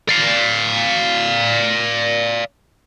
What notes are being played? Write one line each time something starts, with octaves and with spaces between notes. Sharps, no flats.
D5 F5